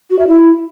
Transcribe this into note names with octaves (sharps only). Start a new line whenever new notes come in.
F#4
E5
E4